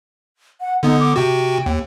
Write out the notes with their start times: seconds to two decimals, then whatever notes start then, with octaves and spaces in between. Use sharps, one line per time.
0.61 F#5
0.83 D3 B3 D#4
1.00 D6
1.16 C3 F#4 G5
1.66 D#2